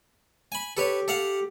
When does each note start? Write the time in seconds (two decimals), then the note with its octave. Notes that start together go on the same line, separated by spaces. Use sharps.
0.52 G#5 B5
0.77 G4 A4 B4 C#5
1.08 A4 F5 F#5